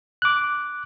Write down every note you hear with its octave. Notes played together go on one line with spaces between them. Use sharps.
D6 F#6